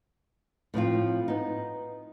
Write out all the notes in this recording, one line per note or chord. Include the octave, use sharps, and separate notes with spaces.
A2 F3 C4 F4
B3 D#4